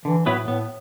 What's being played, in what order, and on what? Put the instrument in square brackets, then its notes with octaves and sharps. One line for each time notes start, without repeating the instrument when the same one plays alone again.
[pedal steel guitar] D3 [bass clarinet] E3
[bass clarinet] A2 [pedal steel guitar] F#3 B3 E4 B4
[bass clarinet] A2 [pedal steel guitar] B3